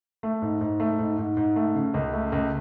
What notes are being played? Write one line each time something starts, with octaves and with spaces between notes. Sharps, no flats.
A3
G#2
G#2
A3
G#2
G#2
G#2
A3
C#3
C#2
A3
C#2